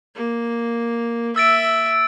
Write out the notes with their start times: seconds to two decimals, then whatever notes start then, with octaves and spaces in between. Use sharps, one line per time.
0.15 A#3
1.36 E5 E6 A6 D7